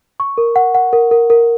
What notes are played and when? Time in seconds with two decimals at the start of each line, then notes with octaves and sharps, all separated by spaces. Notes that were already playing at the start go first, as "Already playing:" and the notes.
0.20 C#6
0.38 A#4
0.56 F#5
0.75 F#5
0.93 A#4
1.11 A#4
1.30 A#4